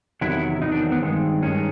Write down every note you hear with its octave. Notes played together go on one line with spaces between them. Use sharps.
E2 C3 D#3 F#3 E4
E4
E2 C3 D#3 F#3 D#4
D4
C4
B3
G2 D#3 G#3 C4
G2 D#3 G#3 C#4